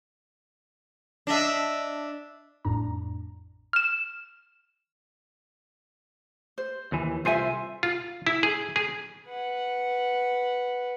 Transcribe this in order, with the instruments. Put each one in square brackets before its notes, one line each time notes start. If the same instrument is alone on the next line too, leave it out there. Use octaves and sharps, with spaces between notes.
[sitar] D4 D#5 E5
[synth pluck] A1 F2 A2 D4 A#5
[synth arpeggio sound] F6 E7
[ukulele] C5
[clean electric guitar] D#2 E3
[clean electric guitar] C2 C5 G#5 [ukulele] F4 A4 E5
[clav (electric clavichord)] F4
E4
G#4
G#4
[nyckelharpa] B4 F#5